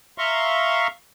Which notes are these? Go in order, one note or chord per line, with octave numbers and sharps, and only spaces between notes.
E5 F5 A#5 C6 C#6